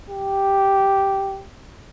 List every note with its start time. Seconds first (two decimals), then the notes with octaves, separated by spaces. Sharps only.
0.10 G4